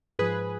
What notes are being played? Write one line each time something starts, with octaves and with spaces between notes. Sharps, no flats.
G#2 F3 G#4 B4